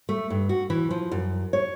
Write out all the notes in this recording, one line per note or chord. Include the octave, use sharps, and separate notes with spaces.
A3
G2
F#4
E3
F3
F#2
C#5